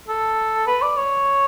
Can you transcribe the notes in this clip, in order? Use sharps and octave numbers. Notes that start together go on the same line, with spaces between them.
A4
B4
D5
C#5